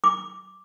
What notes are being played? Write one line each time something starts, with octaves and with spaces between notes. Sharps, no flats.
D6